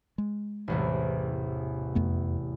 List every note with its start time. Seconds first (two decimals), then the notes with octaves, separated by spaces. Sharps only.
0.18 G#3
0.68 A1 E2 C3
1.95 F2 A3 B3